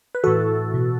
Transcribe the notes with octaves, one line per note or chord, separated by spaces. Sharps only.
B4
A2 E3 F#4 A4
B2